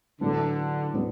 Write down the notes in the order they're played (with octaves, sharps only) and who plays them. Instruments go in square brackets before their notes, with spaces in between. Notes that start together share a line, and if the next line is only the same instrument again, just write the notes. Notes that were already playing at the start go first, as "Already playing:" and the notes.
[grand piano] A2 F#3 B3 D4 [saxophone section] D3
[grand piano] A2 F#3 B3 D4